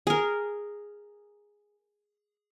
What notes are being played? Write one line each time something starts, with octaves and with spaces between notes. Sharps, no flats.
G#4 A#4